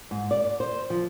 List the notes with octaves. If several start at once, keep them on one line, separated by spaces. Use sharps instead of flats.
G#2
D5
C5
F3